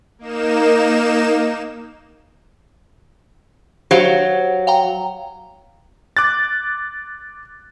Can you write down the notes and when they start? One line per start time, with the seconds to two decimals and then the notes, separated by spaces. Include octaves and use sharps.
0.19 A#3 D#4 E7
3.91 F#3 G4 C5 F5
4.67 F5 G5 A#5
6.17 D6 F#6 A6